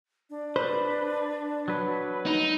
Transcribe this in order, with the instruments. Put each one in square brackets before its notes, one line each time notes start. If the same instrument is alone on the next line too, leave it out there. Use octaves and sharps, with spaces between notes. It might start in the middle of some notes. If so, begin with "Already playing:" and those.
[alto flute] D4
[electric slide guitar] B4 [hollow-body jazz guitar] C5
[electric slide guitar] F#3 B4
[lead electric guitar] D#4